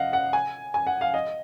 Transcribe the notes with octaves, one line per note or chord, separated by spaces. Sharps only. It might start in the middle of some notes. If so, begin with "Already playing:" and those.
Already playing: D#5 F5 F#5
F#5
G#5
G#5
F#5
F5
D#5